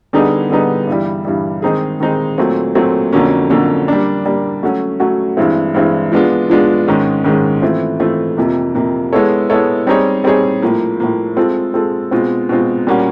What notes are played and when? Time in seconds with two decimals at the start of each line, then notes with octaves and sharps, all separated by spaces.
0.13 D3 G3 B3 D#4 G#4
0.50 D3 G3 B3 D#4 G#4
0.87 G2 E3 G3
1.25 G2 E3 G3
1.62 D#3 G#3 C4 D#4 G#4
2.00 D#3 G#3 C4 D#4 G#4
2.38 A#2 F#3 A3 C4
2.75 A#2 F#3 A3 C4
3.13 F2 D3 F#3 A#3 C#4
3.50 F2 D3 F#3 A#3 C#4
3.88 G3 A#3 D4
4.26 G3 A#3 D4
4.63 F#3 A3 C#4 F#4
5.00 F#3 A3 C#4 F#4
5.37 G2 E3 G#3 C4 E4
5.74 G2 E3 G#3 C4 E4
6.12 F3 G#3 B3 D4 F4
6.50 F3 G#3 B3 D4 F4
6.88 G#2 D#3 G#3 C#4
7.24 G#2 D#3 G#3 C#4
7.62 E3 A3 C4 F4
8.00 E3 A3 C4 F4
8.37 F2 C3 F3 A#3
8.75 F2 C3 F3 A#3
9.13 G#3 B3 E4 A4 C#5
9.50 G#3 B3 E4 A4 C#5
9.87 G3 C4 D#4 G#4 C#5
10.24 G3 C4 D#4 G#4 C#5
10.62 A2 F3 A#3
11.00 A2 F3 A#3
11.37 G#3 C4 F4 A4
11.74 G#3 C4 F4 A4
12.11 B2 G#3 C4 F4
12.49 B2 G#3 C4 F4
12.87 A#2 G3 A#3 C#4 F#4